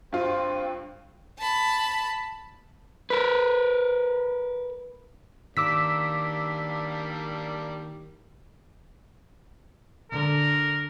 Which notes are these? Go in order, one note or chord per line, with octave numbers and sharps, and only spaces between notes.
G2 C4 F4
A5 B5
A#4 B4
D#3 G3 A#3 D4 D6 E6 B6
D3 A#4